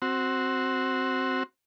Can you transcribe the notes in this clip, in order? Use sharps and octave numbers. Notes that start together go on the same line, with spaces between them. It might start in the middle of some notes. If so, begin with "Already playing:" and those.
C4 F#4